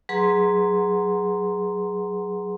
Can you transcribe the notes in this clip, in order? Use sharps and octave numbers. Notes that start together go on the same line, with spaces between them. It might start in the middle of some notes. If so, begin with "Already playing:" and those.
F#3 G#4 B4 F#5 A#5 C6